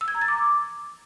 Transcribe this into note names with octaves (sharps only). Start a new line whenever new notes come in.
E6
G#6
A#5
A6
D6